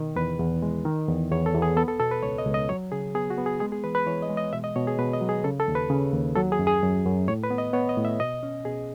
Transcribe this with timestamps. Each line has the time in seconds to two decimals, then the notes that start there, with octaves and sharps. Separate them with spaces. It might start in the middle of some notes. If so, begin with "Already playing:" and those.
Already playing: B2 D#3
0.16 E2 B4
0.39 E2
0.62 G#3
0.85 D#3
1.09 E2
1.31 E2 C#5
1.46 A4
1.54 E2
1.62 G#4
1.77 B3 A4
1.88 A4
2.00 B2 A4
2.11 B4
2.23 C#2 C#5
2.38 D#5
2.46 C#2
2.54 D#5
2.69 F#3 C#5
2.92 C#3 G#4
3.15 B3 G#4
3.30 F#4
3.38 B3
3.46 G#4
3.60 G#3 G#4
3.72 G#4
3.84 E3 B4
3.95 B4
4.07 E3 C#5
4.22 D#5
4.29 G#3
4.37 D#5
4.53 B2 E5
4.64 D#5
4.76 B2 C#5
4.87 G#4
4.99 B2 B4
5.13 D#5
5.21 F#3
5.29 G#4
5.44 C#3 A4
5.60 A4
5.68 D#2
5.75 B4
5.90 C#3
6.14 D#2
6.36 F#3 A4
6.52 G#4
6.59 F#2
6.67 G#4
6.83 F#2
7.05 F#2
7.28 A2 C#5
7.44 B4
7.50 B3
7.58 D#5
7.73 B3 C#5
7.89 D#5
7.97 A2
8.05 E5
8.20 B2 D#5
8.43 C#4
8.65 B2 G#4